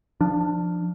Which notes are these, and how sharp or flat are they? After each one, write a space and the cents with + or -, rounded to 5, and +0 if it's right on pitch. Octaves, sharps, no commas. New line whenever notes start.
F3 +0 D4 +15